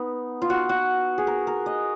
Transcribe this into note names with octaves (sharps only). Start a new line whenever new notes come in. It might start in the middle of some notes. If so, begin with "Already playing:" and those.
Already playing: B3 D#4
F4
F#4
F#4
G#4
A#4
A#4
D#5